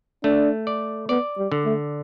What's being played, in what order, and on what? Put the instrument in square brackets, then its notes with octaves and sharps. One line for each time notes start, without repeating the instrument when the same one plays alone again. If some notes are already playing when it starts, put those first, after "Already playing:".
[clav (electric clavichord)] A3 [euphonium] D4
[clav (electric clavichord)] D5
[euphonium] B3 [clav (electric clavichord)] D5
[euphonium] G3
[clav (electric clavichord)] D3
[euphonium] A3